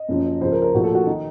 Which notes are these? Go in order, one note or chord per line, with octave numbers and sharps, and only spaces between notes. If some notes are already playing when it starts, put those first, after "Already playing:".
Already playing: D#5
F#1 F#2 F3
C#2 C#3 F3 C5
A#4
A#4
A#1 A2 F3 F#4
A4
F#4
D#3 D#4